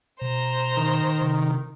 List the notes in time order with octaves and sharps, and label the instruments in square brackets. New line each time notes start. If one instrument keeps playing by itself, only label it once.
[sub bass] B2 [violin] C5 A#5
[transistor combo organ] D#3
[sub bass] C3